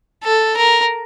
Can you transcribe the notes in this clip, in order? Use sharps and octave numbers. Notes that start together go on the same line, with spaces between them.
A4
A#4